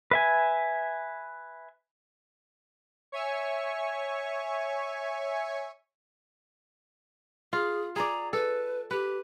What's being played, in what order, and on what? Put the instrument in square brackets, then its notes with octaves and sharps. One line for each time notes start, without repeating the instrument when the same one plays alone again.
[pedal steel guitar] B4 E5 G#5
[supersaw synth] C#5 E5 G#5 C#6
[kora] F4 [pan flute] G#4
[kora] G#4 D5 [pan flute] A#5
[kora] A4 [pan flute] B4
[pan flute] G4 [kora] B4